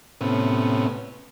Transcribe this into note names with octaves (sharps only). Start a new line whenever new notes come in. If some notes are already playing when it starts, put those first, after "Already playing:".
A2 C3 B3 C#4